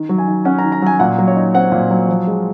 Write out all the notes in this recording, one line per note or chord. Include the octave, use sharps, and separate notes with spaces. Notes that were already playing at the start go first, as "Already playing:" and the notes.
Already playing: D#3
F#3
G#5
D#3
C#4 F#5
A#5
D#3
A#5
F#3 G#5
A#2 F#5
F#3
C#5
D#4
C4 F#5
A#2
F#3
F3
G#3